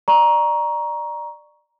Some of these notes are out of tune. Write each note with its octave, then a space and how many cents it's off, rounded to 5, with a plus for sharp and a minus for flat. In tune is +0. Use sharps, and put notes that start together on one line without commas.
D5 +20 A#5 +15 C#6 +5